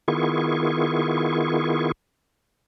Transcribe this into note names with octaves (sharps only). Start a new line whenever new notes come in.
D#3 B3 E4 F4 G#4 C#6